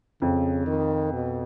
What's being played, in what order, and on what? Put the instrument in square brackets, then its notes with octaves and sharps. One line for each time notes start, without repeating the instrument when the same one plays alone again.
[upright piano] F2 [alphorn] C#3
[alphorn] D#3
B2